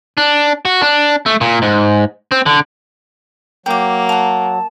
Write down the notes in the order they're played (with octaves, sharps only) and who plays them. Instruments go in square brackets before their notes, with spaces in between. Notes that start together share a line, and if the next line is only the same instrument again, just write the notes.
[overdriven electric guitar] D4
F#4
D4
A3
A#2
G#2
C4
D3
[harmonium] F#3 [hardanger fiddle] A#3 [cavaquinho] G5 D6
[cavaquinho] F5 F#5 [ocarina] A5